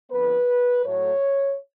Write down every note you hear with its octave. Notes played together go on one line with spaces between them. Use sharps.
F2 D3 F3 B3 B4
A2 F#3 A3 C#5